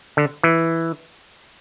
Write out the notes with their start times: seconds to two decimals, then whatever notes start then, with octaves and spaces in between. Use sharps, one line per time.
0.17 D3
0.43 E3